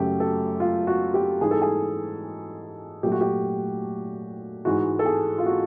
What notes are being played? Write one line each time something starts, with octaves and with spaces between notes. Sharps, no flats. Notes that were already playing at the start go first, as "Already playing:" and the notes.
Already playing: F#2 C#3 F#3 A3 G4
A4
F4
F#4
G4
G#2 E3 G3 G#4
A4
G#4
A#2 F#3 A3 G4
F#4
G4
G#2 E3 G#3 F#4
A4
G#4
F4
F#4